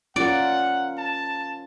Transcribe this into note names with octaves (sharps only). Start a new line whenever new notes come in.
C#4 F4 A#4 D5 F#5
A5